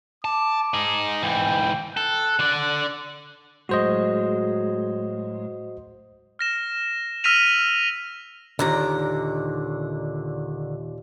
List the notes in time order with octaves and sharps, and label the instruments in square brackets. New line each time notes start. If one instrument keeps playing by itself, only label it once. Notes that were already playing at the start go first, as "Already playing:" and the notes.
[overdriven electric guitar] A5 [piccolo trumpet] D6
[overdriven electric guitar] D#4 G#4
[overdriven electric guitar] G#2 E3 [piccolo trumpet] G5
[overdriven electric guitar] A4 [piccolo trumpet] F#6
[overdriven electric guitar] D3 D5
[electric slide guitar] A2 F#3 G#3 [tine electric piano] F#4 C5 D#5
[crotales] F6 A#6 E7
E6 F6 A#6 B6 D#7 F7
[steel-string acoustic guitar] D#2 A#2 A#5 [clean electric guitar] D3 D#3